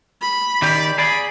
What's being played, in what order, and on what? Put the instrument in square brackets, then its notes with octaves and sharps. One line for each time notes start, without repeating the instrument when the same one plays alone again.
[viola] B5
[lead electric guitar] D#3 G4 [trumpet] D5
[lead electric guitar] G#4 D5 [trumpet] B5